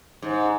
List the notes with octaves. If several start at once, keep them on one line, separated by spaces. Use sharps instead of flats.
G#2